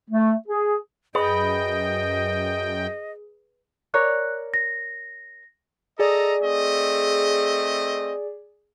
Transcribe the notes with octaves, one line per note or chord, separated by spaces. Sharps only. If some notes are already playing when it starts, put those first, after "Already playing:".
A3
G#4
F#2 G#4 B4 D#5 G5
A#4 C#5 D5 F#6
A#6
G#4 A4 D5 D#5 A#5
A3 C4 D#5